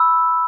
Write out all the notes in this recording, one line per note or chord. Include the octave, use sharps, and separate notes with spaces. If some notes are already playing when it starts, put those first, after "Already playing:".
Already playing: B5 E6